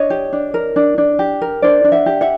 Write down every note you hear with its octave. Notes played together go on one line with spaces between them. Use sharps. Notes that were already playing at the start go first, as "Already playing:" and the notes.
Already playing: D4 C#5 D#5
G4
D4
A#4
D4
D4
G4
A#4
D4 C5 D5
D4
E5 F#5
G4
E5 F#5